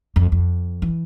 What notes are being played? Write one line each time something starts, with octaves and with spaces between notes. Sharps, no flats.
F2
F2
E3